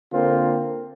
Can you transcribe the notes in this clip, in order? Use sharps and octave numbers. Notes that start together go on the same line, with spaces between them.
D3 A#3 C4 F4